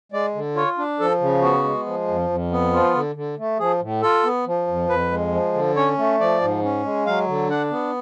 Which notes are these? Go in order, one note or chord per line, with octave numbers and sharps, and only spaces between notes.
G#3 D5
D3
F4 C#5
D4
F3 A4
C#3
B3 F#4
G#3
F3
F2
F2
B3
F3 F4
D3
D3
A3
F3 G#4
A2
F4 A4
B3
F3
F2
F2 B4
G#3
F3
D3
C#4 C#5
A3
F3 D5
G#2
C#4
G#3
F#3 F5
D3
D4 F#5
B3